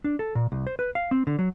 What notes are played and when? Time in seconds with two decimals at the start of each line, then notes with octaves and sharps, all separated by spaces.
0.04 D4
0.19 A4
0.35 A#2
0.52 C2
0.67 C5
0.79 B4
0.95 F5
1.11 C4
1.27 D3
1.39 F#3